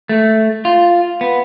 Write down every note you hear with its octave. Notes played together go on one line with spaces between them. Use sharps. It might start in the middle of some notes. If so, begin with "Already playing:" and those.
A3
F4
B3